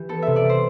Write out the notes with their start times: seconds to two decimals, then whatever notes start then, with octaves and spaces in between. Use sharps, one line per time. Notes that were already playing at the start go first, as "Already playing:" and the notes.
Already playing: E3 G4
0.09 B3 A4
0.22 C3 E5
0.36 D5
0.45 G3 C5